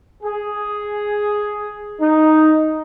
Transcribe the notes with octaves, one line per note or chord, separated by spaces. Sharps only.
G#4
D#4